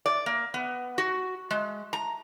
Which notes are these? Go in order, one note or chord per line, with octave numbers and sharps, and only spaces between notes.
D5
A#3
B3
F#4
G#3
A#5